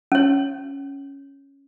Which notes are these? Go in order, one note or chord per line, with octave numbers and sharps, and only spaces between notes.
C#4 C#5